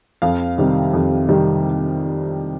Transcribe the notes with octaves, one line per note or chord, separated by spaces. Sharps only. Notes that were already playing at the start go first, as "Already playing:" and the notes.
F2 F5
C3 D#3 G3
F2
C3 D#3 G3